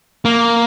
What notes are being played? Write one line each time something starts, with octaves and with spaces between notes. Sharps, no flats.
A#3